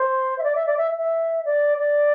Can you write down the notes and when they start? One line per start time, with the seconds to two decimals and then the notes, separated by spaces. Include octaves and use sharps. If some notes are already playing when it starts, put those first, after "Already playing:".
Already playing: C5
0.38 E5
0.43 D5
0.55 E5
0.66 D5
0.77 E5
0.97 E5
1.45 D5
1.77 D5